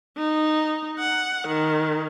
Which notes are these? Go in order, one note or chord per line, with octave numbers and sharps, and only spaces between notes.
D#4
F#5
D#3